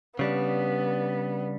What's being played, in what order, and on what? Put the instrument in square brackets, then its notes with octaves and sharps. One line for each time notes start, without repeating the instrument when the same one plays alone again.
[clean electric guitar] C#3 G3 D4 [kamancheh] B3